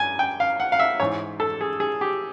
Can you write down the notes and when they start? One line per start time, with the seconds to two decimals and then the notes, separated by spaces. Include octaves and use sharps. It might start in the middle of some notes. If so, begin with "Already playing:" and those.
Already playing: G2 G#5
0.19 G5
0.40 F5
0.60 F#5
0.72 F5
0.79 E5
1.00 G#2 E3 C#5
1.40 A4
1.61 G#4
1.80 G#4
2.01 G4